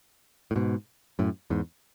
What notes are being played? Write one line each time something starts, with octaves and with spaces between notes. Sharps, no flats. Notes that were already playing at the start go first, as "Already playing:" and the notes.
A2
G#2 B2
F#2 A2
E2 G#2